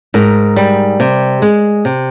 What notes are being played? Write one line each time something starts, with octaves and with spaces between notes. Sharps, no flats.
G#2 A#4
G3
C3
G#3
C3